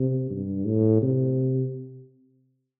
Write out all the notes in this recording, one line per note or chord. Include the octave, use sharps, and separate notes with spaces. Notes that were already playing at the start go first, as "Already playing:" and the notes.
Already playing: C3
G2
A2
C3